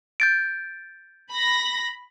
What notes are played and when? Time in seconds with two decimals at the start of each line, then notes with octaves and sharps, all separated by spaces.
0.20 G6 A6 D7
1.30 B5 A#6